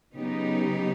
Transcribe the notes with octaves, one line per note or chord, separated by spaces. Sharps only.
C#3 F#3 B3 D#4 G4